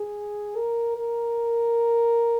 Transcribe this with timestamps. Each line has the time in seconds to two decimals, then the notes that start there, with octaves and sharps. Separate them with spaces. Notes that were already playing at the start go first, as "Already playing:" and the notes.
Already playing: G#4
0.57 A#4
0.96 A#4